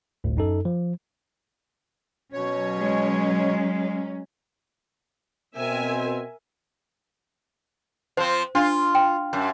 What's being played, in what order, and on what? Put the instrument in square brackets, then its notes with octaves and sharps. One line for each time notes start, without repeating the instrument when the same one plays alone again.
[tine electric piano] G1 D2 A2
F#2 D#4 A4
F3
[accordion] B2 C#5 [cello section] F#3 C#4
[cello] G#3
[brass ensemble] B2 C4 [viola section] A#4 E5 G#5
[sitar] F3 C4 [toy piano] C5
[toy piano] D4 [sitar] F4
[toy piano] G5
[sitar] F#2